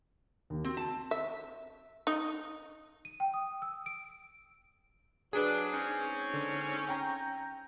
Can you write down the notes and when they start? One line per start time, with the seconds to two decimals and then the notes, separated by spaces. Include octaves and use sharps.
0.50 D#2
0.64 C4 F#4
0.77 A5
1.11 E5
2.07 D#4
3.05 D#7
3.20 G5
3.34 D#6
3.62 E6
3.86 D7
5.33 F#3 D4 G#4 B4
5.73 G#2 C4 C#4
6.34 D3
6.89 G5 A#5 G6